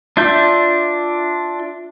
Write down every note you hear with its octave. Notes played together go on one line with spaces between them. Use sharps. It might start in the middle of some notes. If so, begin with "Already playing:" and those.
D4 F4 E5 G6